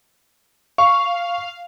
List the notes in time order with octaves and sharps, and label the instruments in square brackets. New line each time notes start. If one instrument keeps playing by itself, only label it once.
[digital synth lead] F5 [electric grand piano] C#6